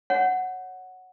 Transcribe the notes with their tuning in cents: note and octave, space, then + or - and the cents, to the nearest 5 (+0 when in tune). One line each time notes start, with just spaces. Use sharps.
C#5 +0 F#5 +0